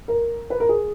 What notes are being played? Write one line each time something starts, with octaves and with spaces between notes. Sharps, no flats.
A#4
B4
A#4
G#4